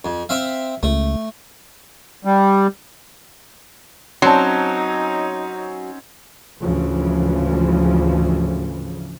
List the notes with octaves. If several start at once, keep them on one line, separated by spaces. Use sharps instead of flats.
F2
C4 E5 F5
C#2 A3
G3
F#3 C4 C#4 D#4 A5 C6
D2 G#2 C#3 E3 F3